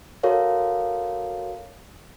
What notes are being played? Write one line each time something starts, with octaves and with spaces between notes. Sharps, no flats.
F#4 A4 A#4 C#5 F5